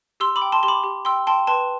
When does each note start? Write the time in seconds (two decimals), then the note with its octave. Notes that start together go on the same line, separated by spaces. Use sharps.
0.20 G4 C6 E6
0.36 B5 D6
0.42 G5
0.52 A5 C6
0.63 G4 C6
0.68 B5 D6
0.84 G4
1.05 G5 C6 E6
1.27 G5 A5 C6
1.47 B4 A5 C6